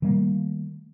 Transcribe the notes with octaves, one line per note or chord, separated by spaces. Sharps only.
D#3 G3 A3 A#3